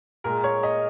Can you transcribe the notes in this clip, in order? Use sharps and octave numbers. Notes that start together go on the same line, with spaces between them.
A#2 G#3 A#4
C#5
D#5